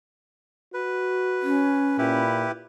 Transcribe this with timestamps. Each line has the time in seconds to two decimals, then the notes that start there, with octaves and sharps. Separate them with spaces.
0.74 F#4 B4
1.43 C#4
1.98 A#2 E4 G4 B4